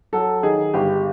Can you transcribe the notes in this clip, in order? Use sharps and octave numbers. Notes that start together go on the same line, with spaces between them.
F#3 A4
D#3 G#4
G1 G4